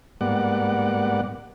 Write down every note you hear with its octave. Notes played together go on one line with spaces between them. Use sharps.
G#2 G3 A#3 B3 D5 F#5